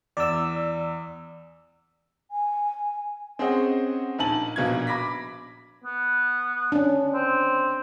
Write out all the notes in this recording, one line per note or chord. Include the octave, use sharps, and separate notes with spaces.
E2 D5 E6
G#5
C4 C#4 G#4 C5 D#5 F#5
A#1 D#4 G#5 A5 F#7
A#1 B2 F5 G#6
B5 D6 A#6 B6
B3
C#4 D4
C4